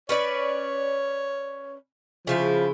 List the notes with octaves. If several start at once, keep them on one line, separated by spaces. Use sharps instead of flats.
C#4 B4 C#5 D5
C#3 F3 E4 F4